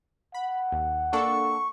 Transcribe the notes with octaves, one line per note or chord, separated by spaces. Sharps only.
F#5 B5
D#2
A#3 D4 A4 C#6